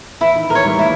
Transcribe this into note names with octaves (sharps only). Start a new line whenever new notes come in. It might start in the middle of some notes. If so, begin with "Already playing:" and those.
E3 E4
D#3
E3 A#4
C#5
D#3 G3
G3 A#3 E4